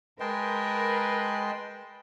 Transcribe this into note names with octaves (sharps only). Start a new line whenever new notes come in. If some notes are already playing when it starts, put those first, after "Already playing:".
G#3 A#4 B4 G5 A5 C6